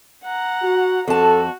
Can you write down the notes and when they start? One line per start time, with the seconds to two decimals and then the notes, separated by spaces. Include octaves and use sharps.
0.24 F#5 A#5
0.62 F#4
1.08 F2 F#4 A4 A5